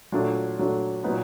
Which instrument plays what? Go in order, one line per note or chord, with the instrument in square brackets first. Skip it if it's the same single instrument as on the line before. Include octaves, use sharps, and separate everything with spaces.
[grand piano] A#2 F#3 A3 D4
A#2 F#3 A3 D4
A#2 F#3 B3 D#4